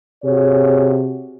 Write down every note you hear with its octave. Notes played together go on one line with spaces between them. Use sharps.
C3 F#4 G#4 C#5